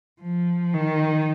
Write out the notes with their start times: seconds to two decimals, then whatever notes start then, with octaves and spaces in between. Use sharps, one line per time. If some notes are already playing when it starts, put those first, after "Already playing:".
0.21 F3
0.74 D#3